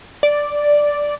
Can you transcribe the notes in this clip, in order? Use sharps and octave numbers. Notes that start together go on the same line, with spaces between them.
D5